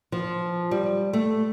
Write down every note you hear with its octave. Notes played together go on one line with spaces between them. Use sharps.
F3
G3
A3